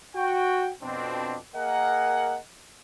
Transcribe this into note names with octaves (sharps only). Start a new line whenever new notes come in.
F#4 G5
F2 B2 C4 D4
A#3 G#4 A#4 D#5 F#5